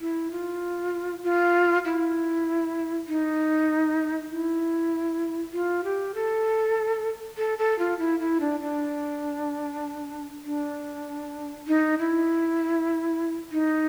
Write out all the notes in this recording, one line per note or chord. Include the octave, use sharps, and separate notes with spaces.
E4
F4
F4
E4
D#4
E4
F4
G4
A4
A4
A4
F4
E4
E4
D4
D4
D4
D#4
E4
D#4